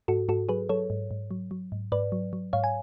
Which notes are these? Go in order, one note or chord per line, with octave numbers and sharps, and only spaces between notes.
G#2 F#4 A4
G#2 F#4 A4
F#3 G#4 B4
F#3 A4 C#5
G#2
G#2
F#3
F#3
G#2
G#2 B4 D5
F#3
F#3
G#2 C#5 F5
G#5